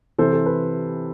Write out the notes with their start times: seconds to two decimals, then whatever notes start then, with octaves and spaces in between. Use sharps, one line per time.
0.18 C3 E3 A4 C5
0.33 A4
0.46 B4